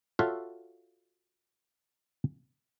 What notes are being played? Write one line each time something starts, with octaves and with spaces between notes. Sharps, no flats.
F4 F#4 A4 C#5 E5 F5